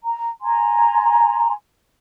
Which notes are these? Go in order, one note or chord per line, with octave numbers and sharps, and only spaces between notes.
A#5
G#5 A#5 C6